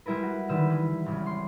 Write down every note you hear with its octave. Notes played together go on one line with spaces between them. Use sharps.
G3 G#3 E4 A#4 B4
F#4
D3 D#3 G3 B4 E6
E3
G#1 C#3
C6